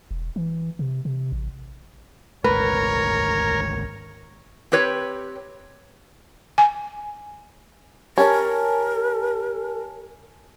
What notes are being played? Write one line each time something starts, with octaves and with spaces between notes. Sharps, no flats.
E1
E3
C3
C3
A1
G#1 D2 G#3 A#4 B4 C#5
C4 G4 B4 C#5
G#5
C#4 G4 A#4 G#5 A5